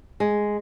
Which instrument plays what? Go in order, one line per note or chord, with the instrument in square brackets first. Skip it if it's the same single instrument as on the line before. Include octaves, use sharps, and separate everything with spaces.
[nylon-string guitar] G#3